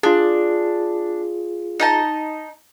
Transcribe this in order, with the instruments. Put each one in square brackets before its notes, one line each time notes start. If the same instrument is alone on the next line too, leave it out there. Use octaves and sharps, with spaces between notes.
[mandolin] D4 [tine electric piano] F4 G#4
[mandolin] D#4 D#5 A5